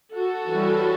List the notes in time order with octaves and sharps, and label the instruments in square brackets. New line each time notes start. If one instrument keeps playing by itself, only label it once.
[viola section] F#4 A4
E3 G3 C#4